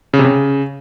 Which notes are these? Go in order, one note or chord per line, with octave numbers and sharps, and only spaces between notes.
C#3
C3
C#3